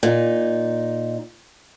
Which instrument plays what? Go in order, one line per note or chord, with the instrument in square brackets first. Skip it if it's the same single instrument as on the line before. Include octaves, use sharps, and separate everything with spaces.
[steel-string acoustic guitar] A#2 D#4